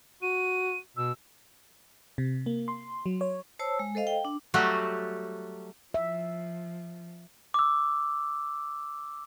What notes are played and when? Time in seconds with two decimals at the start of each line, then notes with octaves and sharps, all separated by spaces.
0.22 F#4 D#7
0.97 B2 E6
2.18 C3
2.46 A#3
2.68 C6
3.06 F#3
3.21 C#5
3.59 C5 C#5 A5 E6
3.79 G#3
3.95 A4 C5 D#5 F5
4.07 G5
4.25 D4
4.54 F#3 G3 A3 F#4
5.94 F3 E5
7.54 D6 E6